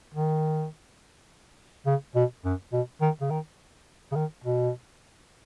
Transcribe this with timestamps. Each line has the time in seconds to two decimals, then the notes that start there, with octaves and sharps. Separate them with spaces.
0.14 D#3
1.86 C#3
2.16 B2
2.45 F#2
2.72 B2
3.01 D#3
3.21 C#3
3.30 D#3
4.12 C#3
4.16 D#3
4.44 B2